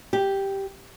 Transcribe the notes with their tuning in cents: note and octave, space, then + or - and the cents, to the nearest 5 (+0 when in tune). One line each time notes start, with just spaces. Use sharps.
G4 +0